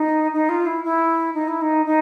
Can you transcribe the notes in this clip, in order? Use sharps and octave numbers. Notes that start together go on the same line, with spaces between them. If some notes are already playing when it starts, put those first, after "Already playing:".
Already playing: D#4
D#4
F4
E4
E4
D#4
E4
D#4
D#4